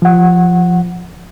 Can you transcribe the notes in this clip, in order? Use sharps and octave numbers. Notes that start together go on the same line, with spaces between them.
F3 F#5